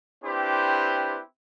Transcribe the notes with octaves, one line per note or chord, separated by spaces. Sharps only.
C4 D4 E4 G4 B4 C5